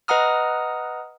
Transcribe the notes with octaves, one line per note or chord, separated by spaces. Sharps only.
B4 D#5 F#5 A#5 D#6 F6